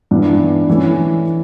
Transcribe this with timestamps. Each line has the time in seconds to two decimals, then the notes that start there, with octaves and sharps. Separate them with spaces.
0.11 G2 E3 B3 D4
0.69 E3 A3 C#4